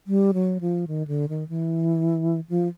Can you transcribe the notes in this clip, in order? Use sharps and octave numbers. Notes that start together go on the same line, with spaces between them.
G3
F#3
F3
D#3
D3
D#3
E3
F3